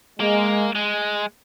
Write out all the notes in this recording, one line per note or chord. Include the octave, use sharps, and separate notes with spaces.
G#3 A#3
G#3